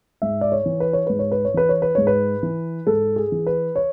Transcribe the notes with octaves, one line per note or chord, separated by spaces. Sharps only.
G#2 E5
D5
C#5
E3
B4
C#5
G#2 B4
C#5
B4
C#5
E3 B4
C#5
B4
G#2 C#5
B4
E3
G#2 A4
G#4
E3
B4
C#5